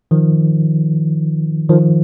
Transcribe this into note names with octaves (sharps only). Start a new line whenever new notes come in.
D#3 F3
D#3 F3